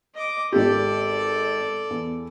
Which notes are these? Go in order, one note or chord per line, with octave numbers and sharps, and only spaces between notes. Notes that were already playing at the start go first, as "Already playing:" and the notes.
D#5 D6
G#1 G4 A4 D5
E2